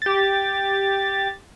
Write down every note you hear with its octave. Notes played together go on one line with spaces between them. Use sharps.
G4 A6